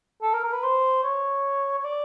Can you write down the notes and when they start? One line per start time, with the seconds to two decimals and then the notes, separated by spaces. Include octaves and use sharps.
0.22 A4
0.33 A#4
0.44 A#4
0.53 B4
0.63 C5
1.03 C#5
1.78 C#5
1.84 D5